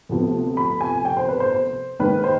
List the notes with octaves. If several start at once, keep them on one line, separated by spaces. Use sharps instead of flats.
D2 C3 F3 B3
B5
G#5
G5
C5
B4
C5
C5
D#2 D#3 G#3 B4
C5